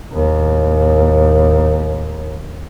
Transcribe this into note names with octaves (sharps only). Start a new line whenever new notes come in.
D#2 A2